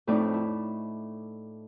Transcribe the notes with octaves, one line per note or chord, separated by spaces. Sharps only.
F2 A2 A3 D#4 D5 C#6
E4